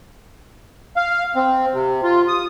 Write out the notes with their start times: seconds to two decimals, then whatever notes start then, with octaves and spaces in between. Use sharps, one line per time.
0.96 F5
1.35 C4
1.74 C3
2.03 F4
2.28 D#6